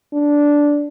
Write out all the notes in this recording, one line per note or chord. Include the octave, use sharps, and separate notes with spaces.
D4